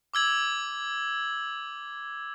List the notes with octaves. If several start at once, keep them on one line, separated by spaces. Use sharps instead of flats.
D6 E6 G#6 F#7